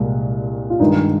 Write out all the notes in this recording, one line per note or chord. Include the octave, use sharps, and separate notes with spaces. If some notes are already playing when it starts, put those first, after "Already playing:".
Already playing: C2 A#2 G#3
F4
G2 D#3 G#3 D#4